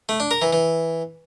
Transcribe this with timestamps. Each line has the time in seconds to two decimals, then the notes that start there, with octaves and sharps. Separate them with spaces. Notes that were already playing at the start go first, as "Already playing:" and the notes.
0.09 A3
0.20 D4
0.31 A#4
0.42 E3
0.53 E3